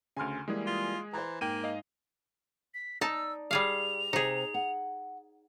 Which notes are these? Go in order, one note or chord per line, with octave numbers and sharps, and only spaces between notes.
D2 C#3 G#5 C6 F6
E3 G3 G#3 A#3 G#4
F4
E3 C5 A#5
G#2 A#3 G5 D#7
D#5 F5
B6
D#4 D5 A5 E6
G3 G#4 F5 F7
C3 D#4 G#4
F#5